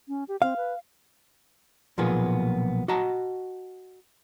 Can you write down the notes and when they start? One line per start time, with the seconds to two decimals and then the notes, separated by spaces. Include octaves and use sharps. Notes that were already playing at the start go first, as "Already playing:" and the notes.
0.08 C#4
0.28 G4
0.42 C4 F5
0.57 B4
1.98 B1 A#2 F3 A#3 B3 G#4
2.88 F#4 D#5 F#5 A5 A#5